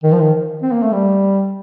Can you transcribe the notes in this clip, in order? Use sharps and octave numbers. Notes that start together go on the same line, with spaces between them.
D#3
F3
D#3
C4
A#3
A3
G3